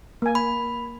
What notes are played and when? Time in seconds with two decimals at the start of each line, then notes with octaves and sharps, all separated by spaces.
0.22 A#3 G#5
0.35 B5